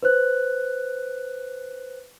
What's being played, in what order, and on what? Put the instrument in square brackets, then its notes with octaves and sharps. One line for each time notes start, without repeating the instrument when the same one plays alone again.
[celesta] B4 C5 F#6